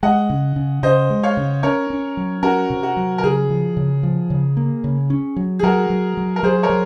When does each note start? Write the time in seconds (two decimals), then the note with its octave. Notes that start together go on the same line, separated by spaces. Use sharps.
0.03 G#3 D#5 F#5
0.30 C#3
0.56 C#3
0.83 C#3 C5 D#5
1.10 G#3
1.23 C#5 F5
1.37 C#3
1.63 C#4 A#4 C#5
1.90 C#4
2.17 F#3
2.43 C#4 F#4 A#4
2.70 C3
2.83 F#4
2.97 F#3
3.18 A#4
3.23 C#3 G#4
3.50 F3
3.77 C#3
4.03 F3
4.30 C#3
4.57 A#3
4.84 C#3
5.10 C#4
5.36 F#3
5.59 G#4
5.63 F#3 F#4 A#4
5.90 F#3
6.17 F#3
6.36 A#4
6.43 F#3 G#4 C5
6.63 A#4 C#5
6.70 F#3